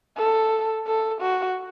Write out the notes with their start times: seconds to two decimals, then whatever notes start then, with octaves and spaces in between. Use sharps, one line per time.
0.17 A4
0.87 A4
1.21 F#4